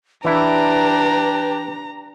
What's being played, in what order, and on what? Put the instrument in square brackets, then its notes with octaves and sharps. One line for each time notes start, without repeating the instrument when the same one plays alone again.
[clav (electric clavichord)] E3 E4 [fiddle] D4 G4 [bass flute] B4 [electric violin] A#5